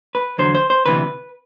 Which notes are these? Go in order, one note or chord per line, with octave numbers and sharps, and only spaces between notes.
B4
E2 D3 F#3 C5
C5
C5
D2 C3 E3 B4